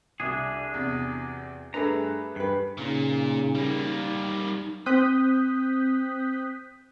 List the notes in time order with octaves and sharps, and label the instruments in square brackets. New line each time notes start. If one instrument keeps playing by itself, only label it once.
[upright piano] C2 [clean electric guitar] D4 G#4 [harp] F#4 E5
[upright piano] E2 C3
[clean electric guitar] G2 A4 A#5 [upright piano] A3 G#4 B4 [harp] D4
[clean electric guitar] G2 [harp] B4 B6
[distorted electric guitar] A#2 [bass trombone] C#3 [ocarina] D#4
[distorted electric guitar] G3 A#3
[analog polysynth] C4 D#6 F#6 G6 B6